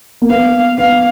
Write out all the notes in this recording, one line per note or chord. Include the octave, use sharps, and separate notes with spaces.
A#3
B3 F5
B3 F5